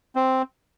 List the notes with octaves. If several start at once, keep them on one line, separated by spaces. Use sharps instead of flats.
C4